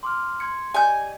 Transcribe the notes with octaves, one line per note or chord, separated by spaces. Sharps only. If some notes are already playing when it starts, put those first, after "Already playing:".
C6 D6 F6
C6 G#6 C#7
G4 D5 D#5 G#5 G6